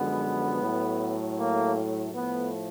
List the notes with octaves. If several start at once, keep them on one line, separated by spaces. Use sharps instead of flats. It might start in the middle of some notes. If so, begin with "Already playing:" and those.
Already playing: F#2 D3 F3 G#3 B3
A2 F#3 A3
A#3
A2 F3 A3 B3